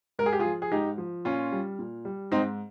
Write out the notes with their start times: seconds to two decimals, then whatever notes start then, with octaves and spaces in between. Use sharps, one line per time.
0.19 G#2 A#4
0.26 G#4
0.33 G4
0.39 F4 G#4
0.45 F3
0.62 G#4
0.72 G#2 D#4 G4
0.98 F3
1.25 A#2 C#4 F4
1.52 G3
1.79 A#2
2.05 G3
2.31 G#2 C4 D#4